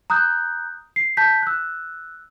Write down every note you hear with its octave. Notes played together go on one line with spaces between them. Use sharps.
A#5 D#6 F#6 G6
C7
A5 G6 B6
E6 F#6